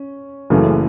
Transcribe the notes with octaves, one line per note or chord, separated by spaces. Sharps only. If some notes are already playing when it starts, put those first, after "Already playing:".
Already playing: C#4
F#1 F#2 C#3 E3 A3